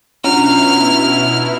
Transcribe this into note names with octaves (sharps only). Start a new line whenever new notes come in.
B2 F#3 C#4 D4 E4 F4 F6